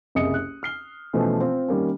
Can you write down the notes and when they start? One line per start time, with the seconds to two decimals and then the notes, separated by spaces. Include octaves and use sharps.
0.15 F#1 C2 G#4 D#5 D#6 C#7
0.34 F#6
0.63 F6 C7 G7
1.13 B2 E3 F3 A3 C#4
1.40 C4 F4
1.68 D#3 G3 A#3 C#4